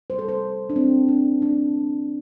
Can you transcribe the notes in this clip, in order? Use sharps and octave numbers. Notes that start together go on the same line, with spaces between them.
C3 G3 C5
A4
C5
D4
C4
D4
D3 A3 D4